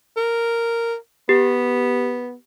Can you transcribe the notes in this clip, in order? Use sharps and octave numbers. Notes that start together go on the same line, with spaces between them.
A#4
B3 G4